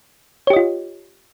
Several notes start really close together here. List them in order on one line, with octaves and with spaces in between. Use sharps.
C#5 G4 D#5 F4